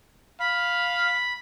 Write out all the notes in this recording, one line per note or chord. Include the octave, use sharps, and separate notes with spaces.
F5 B5